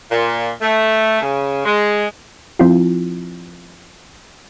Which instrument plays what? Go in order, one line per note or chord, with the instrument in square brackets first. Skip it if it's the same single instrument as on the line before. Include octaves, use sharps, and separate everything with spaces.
[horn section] A#2
A3
C#3
G#3
[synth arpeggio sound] F3 C4 E4 F4